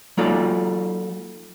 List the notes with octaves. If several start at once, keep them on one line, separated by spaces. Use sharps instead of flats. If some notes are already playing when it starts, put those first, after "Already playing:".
F#3 A#3 D#4 F4 A4 D5